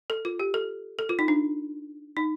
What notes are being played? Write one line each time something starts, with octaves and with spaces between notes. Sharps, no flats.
A4
F4
G4
A4
A4
F4
D#4
D4
D#4